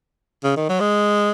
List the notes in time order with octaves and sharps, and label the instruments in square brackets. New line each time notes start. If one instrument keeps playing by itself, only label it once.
[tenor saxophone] C#3
D#3
F#3
G#3